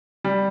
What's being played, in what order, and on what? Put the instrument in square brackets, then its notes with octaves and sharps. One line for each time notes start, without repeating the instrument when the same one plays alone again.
[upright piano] G3